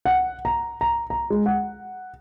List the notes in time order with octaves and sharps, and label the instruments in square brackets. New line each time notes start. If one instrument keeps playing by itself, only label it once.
[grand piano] F#5
A#5
A#5
A#5
G#3
F#5